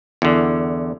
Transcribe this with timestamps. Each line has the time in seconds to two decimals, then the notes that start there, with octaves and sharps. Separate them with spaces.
0.22 E2 D3